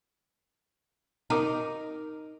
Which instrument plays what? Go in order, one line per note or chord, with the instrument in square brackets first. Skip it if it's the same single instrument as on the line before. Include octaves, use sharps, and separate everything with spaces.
[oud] D#4 [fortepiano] A#4 D6